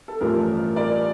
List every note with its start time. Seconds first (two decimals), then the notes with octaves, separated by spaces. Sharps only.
0.08 A4
0.20 A1 G2 F3 A3 A#4
0.76 A#4 D5